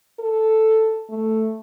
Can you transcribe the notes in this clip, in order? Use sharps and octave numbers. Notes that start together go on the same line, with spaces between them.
A4
A3